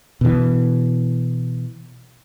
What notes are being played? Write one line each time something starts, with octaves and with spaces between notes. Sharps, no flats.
B2 E3